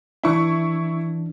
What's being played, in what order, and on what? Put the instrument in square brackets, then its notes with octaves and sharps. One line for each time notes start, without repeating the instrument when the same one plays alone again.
[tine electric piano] E3 D4 [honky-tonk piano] E4 C#6